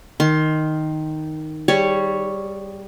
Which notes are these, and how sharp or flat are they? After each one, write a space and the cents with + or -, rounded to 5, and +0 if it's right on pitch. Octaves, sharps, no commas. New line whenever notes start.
D#3 +0 C6 +20
G3 +0 G#4 -25 C#5 +0